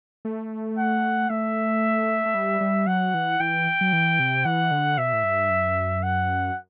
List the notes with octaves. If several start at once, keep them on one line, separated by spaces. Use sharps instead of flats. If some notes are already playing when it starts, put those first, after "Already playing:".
A3
F#5
A3 E5
A3
G3
G3
F#3 F#5
E3
E3 G5
F#3
E3
C3
E3 F#5
D3
B2 E5
A2
G2
F#2
F#5